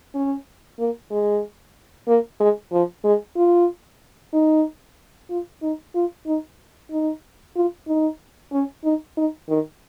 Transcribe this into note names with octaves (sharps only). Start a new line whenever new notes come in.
C#4
A#3
G#3
A#3
G#3
F3
G#3
F4
D#4
F4
D#4
F4
D#4
D#4
F4
D#4
C#4
D#4
D#4
D#3